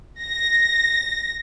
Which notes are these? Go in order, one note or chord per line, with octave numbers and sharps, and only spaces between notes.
A#6